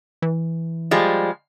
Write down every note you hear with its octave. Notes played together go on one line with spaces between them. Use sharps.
E3
F3 G3 G#3